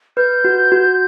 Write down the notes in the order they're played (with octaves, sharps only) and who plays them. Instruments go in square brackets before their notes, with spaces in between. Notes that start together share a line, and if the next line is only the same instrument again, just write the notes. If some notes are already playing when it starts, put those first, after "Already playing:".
[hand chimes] B4 [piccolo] G6
[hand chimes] F#4
F#4